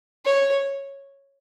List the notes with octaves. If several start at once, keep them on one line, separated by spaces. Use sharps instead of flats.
C#5